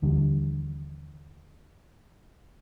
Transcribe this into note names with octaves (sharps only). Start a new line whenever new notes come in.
D#2 D3 E3 G3